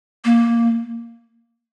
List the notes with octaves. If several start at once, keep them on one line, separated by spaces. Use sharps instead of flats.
A#3